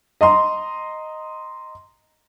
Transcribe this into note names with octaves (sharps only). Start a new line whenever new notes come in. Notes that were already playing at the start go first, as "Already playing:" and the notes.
D#5 A#5 C6